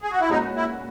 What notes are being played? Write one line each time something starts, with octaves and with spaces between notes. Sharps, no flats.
G#4
F#4
E4
A#2 G#3 C#4 D#4 F#4 B4
E4